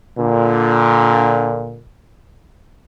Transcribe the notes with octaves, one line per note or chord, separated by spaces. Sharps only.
A#2 D3